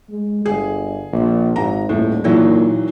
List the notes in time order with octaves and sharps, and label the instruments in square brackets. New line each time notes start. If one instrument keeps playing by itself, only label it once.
[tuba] G#3
[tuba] G1 [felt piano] G#4
[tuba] A#1
[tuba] G#1 [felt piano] A#5
[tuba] D#1 [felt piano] A2
[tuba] A#2 [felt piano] D#3 E3 F#3